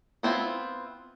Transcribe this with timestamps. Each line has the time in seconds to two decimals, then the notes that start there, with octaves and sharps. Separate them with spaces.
0.23 B3 C4 E4 F4